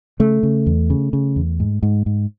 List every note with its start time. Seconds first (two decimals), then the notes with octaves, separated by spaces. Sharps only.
0.20 C#3 A3
0.43 C#3
0.66 E2
0.90 C#3
1.13 C#3
1.36 E2
1.60 G#2
1.83 G#2
2.06 G#2